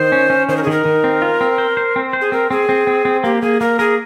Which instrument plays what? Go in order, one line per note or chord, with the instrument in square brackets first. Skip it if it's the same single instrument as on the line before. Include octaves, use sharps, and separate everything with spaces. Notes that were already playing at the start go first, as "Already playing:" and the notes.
Already playing: [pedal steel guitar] D#3 [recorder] C5
[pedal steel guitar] C#4
C#4
[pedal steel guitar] D#3 [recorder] C5
[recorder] A#4
G#4
[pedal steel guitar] D#3 [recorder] A#4
[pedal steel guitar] D#3
C4
F4
C4
C5
C5
C4
C5
[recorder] G#4
[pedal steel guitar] C4 [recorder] A#4
[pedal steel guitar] C4 [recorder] G#4
[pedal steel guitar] C4
C4
C4
[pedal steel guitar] A#3 [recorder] G4
[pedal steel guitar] A#3 [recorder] G#4
[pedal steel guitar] A#3 [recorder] A#4
[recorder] G#4 [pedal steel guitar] A#4